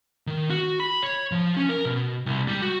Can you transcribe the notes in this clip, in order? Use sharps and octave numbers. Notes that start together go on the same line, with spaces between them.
D#3
F#4
B5
C#5
F3
C#4
A#4
B2
C2
G3
F#4